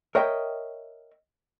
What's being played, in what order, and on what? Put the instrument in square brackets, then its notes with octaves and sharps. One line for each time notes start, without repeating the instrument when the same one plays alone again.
[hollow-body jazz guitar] A#4 C#5 D#5 E5 G5